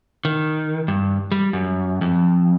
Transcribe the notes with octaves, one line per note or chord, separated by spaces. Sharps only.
D#3
G2
G3
F#2
F2